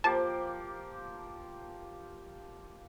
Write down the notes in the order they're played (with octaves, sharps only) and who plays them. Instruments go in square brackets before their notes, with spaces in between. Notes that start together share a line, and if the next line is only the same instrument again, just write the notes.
[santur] F3 A#3 G4 [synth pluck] A5